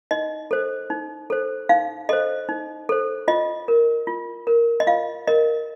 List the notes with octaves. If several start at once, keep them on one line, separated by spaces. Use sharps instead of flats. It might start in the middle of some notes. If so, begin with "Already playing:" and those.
D#4 D#5
A4 C5
D#4
A4 C5
D#4 F5
A4 C5 D#5
D#4
A4 C5
F4 D#5
A#4
F4
A#4
D#5
F4 F5
A#4 D#5